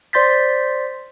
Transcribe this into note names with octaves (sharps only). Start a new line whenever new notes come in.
C5 D5 C6 G6 A6 B6